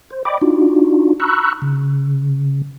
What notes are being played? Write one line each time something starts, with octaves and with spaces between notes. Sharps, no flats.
C5
D5 D#5 G5 B5 D6
D4 D#4 F4 F#4
A#5 B5 C#6 E6 F#6
C#3